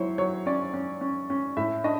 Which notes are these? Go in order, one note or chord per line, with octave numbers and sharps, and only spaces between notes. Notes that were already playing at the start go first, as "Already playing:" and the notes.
Already playing: F#3 E4 C5 C#5
F#3 C#5
C#4 D5
C#4
C#4
C#4
A2 E5
D4 D#5